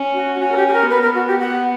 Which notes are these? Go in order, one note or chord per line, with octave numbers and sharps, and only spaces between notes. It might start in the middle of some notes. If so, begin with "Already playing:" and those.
Already playing: C#4
F#4
C#4 F#4
A#4
G4
G4
A#4
B3 B4
A#4
F#4
G4
F#5